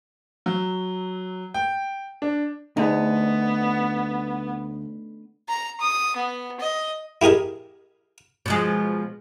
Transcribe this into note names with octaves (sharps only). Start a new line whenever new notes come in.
F#3
G5
D4
D2 B3 D#4 G#4
A#5
D#6
B3
D#5
E4 G4 G#4 A#4 D#5
B2 F3 G#3